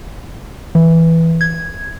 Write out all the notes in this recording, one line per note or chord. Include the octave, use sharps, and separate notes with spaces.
E3
G#6